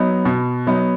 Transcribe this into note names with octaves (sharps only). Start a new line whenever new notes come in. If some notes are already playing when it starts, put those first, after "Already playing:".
Already playing: F#3 B3 D#4
B2
F#3 B3 D#4